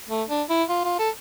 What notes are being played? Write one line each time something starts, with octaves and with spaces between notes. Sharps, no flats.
A3
D4
E4
F4
F4
A4